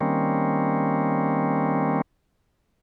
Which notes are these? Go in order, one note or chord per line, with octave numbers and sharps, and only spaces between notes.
D#3 G3 A#3 C4 C#4